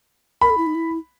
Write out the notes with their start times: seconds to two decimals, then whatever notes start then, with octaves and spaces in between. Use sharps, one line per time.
0.41 A#4 B5
0.50 A4
0.58 E4
0.66 D#4
0.75 E4